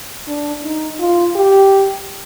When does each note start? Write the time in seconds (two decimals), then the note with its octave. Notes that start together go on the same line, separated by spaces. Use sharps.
0.27 D4
0.63 D#4
1.00 F4
1.35 G4